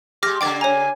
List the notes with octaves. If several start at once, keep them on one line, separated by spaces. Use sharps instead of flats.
G#3 G4 D6 F6 A#6
C#3 A#3 D4 G5 D6 A6
C#5 G#5 A#5